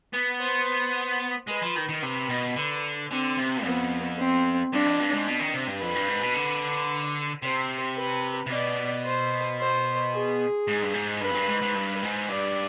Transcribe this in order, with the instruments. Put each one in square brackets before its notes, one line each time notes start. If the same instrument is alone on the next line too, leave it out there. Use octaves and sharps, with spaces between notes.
[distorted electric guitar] B3
[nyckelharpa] C5
[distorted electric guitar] G#3 [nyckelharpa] B4
[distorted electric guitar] F3
D#3
D#3
[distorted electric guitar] C3 [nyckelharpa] B4
[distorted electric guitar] B2
D3
[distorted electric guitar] D3 [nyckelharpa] C4
[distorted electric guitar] C3
[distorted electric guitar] F2 [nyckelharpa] B3
[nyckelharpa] C4
[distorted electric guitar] G2 [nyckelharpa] D4
[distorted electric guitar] F2
G2
G#2
B2
D#3
C3
G2
[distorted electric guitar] F2 [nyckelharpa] B4
[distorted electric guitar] G2
G#2
B2
D3
[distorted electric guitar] C3 [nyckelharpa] C5
[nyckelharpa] B4
[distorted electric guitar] C3
[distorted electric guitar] B2 [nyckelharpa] D5
[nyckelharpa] C5
C5
G#4
[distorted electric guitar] G#2
G2
G#2
[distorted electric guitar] G2 [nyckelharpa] B4
[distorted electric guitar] F2
G2
G#2
G#2
G2
G#2
[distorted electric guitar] G2 [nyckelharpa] D5